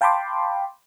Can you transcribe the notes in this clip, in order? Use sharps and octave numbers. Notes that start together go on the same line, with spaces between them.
F5 G5 A5 B5 C6 D6